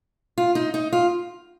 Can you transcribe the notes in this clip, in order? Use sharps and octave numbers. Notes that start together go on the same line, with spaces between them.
F4
D#4
D#4
F4